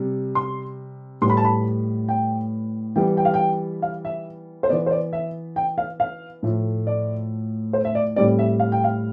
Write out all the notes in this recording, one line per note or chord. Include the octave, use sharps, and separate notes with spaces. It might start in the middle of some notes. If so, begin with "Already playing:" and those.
Already playing: C3 G3
C6
A2 G3 B3 C6
B5
A5
B5
G5
E3 G3 B3 G5
G5
F5
G5
F5
E5
C5
E3 B3 D5
C5
D5
E5
G5
F5
F5
A2 F3 A3
D5
C5
E5
D5
A2 G3 C4 D5
E5
F5
G5
F5